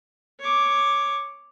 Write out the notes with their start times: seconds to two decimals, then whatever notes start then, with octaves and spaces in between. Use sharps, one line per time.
0.39 C#5 D6